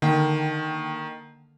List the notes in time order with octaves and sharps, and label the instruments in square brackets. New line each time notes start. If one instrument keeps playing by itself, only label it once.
[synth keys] D3 A#3 G5 [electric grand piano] D#3